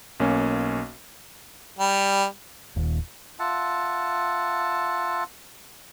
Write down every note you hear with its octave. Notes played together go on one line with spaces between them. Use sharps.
B1 A#3 C#4
G3
D#1
F4 E5 F#5 A5